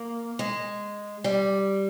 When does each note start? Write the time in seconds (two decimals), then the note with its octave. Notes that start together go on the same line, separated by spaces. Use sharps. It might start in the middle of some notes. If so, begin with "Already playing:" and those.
Already playing: A#3
0.39 G#3
1.24 G3